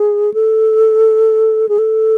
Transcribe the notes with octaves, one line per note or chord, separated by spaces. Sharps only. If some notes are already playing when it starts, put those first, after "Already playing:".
Already playing: G#4
A4
G#4
A4